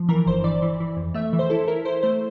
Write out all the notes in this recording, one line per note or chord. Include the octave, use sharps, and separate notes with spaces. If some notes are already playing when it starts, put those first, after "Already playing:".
Already playing: F3
E3 A#4
G1 C5
E3 D5
E3
E3
F2
A3 E5
E3
C5
E4 A4
E4 A#4
E4 C5
A3 C5